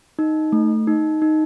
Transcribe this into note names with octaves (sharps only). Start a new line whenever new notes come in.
D#4
A3
D#4
D#4